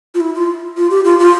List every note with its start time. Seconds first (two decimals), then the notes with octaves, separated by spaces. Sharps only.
0.15 F4
0.20 E4
0.35 F4
0.77 F4
0.91 G4
1.05 F4
1.19 F4